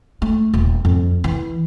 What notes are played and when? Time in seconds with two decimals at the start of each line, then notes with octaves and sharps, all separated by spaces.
0.22 A3
0.54 D#1
0.85 F2
1.24 E3